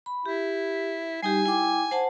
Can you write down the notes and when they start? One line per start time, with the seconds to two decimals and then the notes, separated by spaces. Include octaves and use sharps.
0.06 B5
0.26 E4 G4
1.23 G3 D#4 G4 G#5
1.46 E4 G5 D6
1.91 C5 F#5 A5